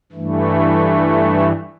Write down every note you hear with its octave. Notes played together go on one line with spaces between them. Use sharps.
G2 E3 A3